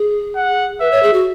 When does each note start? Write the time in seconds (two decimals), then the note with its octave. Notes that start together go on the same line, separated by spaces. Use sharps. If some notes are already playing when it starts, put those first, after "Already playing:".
Already playing: G#4
0.36 F#5
0.80 B4 E5
0.91 C#5
1.03 G#4
1.13 F#4